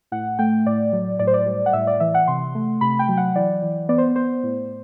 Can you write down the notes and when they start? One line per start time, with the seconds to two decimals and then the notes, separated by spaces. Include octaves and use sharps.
0.12 A2 F#5
0.39 A3 G5
0.66 A2 D5
0.93 F#3
1.19 A2 D5
1.27 C5
1.34 D5
1.46 G3
1.66 F#5
1.73 A2 E5
1.87 D5
2.00 E3 E5
2.14 F#5
2.28 C3 C6
2.55 A3
2.81 C3 B5
2.99 G5
3.09 F#3
3.17 F#5
3.35 E3 D5
3.62 E3
3.89 B3 D5
3.98 C5
4.16 B3 C5
4.43 A2